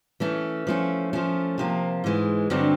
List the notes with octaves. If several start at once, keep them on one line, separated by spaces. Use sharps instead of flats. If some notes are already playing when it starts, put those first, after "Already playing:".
E3 A3 C#4
F3 A3 C#4
F3 A3 C#4
C3 F3 A#3
G#2 E3 G#3
G2 D3 F#3 A3 C4